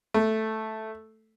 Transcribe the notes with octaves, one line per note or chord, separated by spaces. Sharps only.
A3